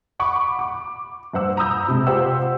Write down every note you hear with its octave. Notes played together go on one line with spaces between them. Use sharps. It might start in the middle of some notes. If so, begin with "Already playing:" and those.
F#5 B5 C#6 D6
D6
G2 C5 F#5 E6
A#5 B5 D#6 E6 G6
C3 G#3
F4 G4 C5 F#5 G5 E6